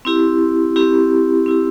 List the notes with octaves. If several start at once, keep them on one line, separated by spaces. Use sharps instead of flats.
C4 E4 G4
C4 E4 G4
C4 E4 G4